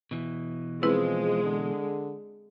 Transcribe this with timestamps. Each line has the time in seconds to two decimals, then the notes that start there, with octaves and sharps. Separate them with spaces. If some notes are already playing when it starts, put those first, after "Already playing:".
0.11 B2 E3
0.83 F3 G#3 C4 E4 B4
1.43 D3